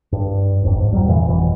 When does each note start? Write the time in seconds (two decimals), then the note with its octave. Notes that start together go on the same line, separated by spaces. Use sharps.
0.12 G2
0.62 D1 G#1 F2
0.76 G#2
0.92 F2 F#3 G3
1.06 F2 A#2 D3 E3
1.27 G1 F2 B2 E3